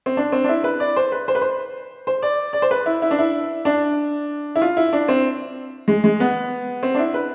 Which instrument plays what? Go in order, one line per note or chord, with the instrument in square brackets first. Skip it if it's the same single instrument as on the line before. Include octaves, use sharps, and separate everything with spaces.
[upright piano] C4
D4
C4
D4
E4
B4
D5
C5
B4
C5
B4
C5
C5
D5
D5
C5
B4
E4
E4
D4
E4
D4
E4
F4
E4
D4
C4
G#3
G#3
B3
C4
D4
E4
B4